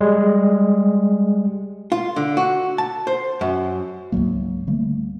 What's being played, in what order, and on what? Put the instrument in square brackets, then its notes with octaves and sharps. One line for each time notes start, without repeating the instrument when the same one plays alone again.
[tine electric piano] G3 G#3
[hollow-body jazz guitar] F4
D3
F#4
A5
C5
F#2
[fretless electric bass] C#2 G#2 F#3 A#3
D3 G3 A3 A#3